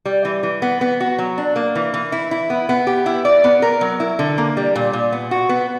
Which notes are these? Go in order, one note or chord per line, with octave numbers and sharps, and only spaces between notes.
G3
E3
E3
B3
B3
F#4
F#3
D4
A#3
E3
E3
E4
E4
B3
B3
G4
E4
D5
B3
A#4
F#3
E4
D3
A#3
G3
A#2
A#2
B3
F#4
B3